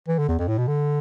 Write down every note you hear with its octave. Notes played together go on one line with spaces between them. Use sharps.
E3
D3
E2
F2
A2
B2
D3